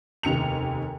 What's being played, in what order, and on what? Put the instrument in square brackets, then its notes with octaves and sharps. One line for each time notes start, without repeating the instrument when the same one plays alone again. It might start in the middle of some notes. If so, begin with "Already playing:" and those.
[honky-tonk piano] F1 D#2 C#7 F7